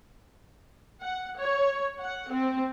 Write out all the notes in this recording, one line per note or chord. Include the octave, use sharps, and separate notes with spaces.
F#5
C#5
F#5
C4